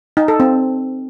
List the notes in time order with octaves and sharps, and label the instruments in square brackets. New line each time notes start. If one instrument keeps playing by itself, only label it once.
[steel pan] D#4
A4
C4